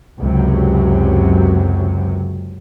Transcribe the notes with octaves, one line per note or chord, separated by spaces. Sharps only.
C#2 F#2 C3 F#3